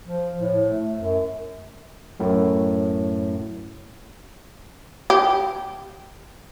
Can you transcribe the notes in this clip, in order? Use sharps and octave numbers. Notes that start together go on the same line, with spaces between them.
F3
A2
A3
F#2
F#2 A2
G4